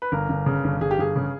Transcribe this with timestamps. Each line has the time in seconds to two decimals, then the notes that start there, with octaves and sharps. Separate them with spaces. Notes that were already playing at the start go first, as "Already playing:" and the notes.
0.02 B4
0.12 G1 A#4
0.29 G1
0.46 C#3
0.64 G1
0.81 G1 G#4
0.91 G4
0.98 G1 G#4
1.16 C#3